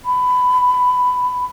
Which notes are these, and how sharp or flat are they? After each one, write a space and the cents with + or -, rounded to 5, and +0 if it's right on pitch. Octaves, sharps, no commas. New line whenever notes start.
B5 +15